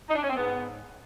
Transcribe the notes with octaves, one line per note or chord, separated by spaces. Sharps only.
D#4
D4
C#4
C4
G#2 B3